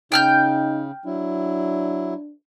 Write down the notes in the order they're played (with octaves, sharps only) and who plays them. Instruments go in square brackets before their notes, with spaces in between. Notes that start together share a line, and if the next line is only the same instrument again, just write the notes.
[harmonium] C#3 [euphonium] D#4 [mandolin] G5 F6 G6
[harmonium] F#3 E4 [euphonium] D4